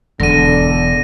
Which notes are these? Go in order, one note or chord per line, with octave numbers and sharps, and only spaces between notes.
E1 D3 A#6 D#7